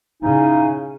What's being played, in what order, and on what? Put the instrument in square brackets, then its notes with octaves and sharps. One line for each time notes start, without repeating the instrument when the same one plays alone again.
[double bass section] C#3 [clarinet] D#4 [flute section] E4 F5 G#5